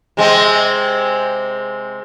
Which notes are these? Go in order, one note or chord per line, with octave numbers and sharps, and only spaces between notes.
C3 G#3 C4